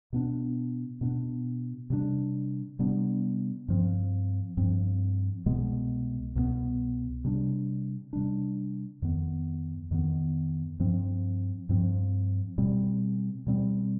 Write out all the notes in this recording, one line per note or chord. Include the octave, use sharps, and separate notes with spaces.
B2 B3 D4
B2 B3 D4
C3 G3 B3 D4
C3 G3 B3 D4
G2 F3 C4
G2 F3 C4
C2 B2 G#3 B3
C2 B2 G#3 B3
C3 G3 D4
C3 G3 D4
F2 D#3 B3
F2 D#3 B3
G2 F3 C4
G2 F3 C4
B2 G3 C4
B2 G3 C4